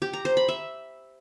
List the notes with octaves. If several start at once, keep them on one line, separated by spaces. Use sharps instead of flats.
G4
A#5
C5
B5
E5